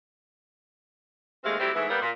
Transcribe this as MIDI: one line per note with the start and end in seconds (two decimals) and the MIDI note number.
1.44 1.56 39
1.44 1.56 56
1.44 1.56 57
1.44 1.56 60
1.44 1.56 77
1.59 1.69 54
1.59 1.69 55
1.59 1.69 57
1.59 1.69 60
1.59 1.69 64
1.59 1.69 67
1.74 1.85 44
1.74 1.85 52
1.74 1.85 57
1.74 1.85 59
1.74 1.85 64
1.89 2.01 55
1.89 2.01 58
1.89 2.01 59
2.02 2.10 46